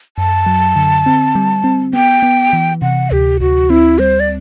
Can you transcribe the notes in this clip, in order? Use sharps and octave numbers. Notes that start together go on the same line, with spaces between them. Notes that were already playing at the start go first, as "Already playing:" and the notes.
F#2 A5
F#3
D3
C4
G3
C4
B3 G5
B3
E3
C3 F#5
D2 G4
D2 F#4
C4 E4
G3 C5
D5